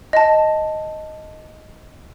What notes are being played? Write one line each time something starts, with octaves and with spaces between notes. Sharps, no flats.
D#5 A5